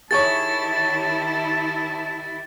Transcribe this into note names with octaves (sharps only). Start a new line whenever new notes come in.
D#3 E4 G4 G#4 C#5 A5 C#6 A6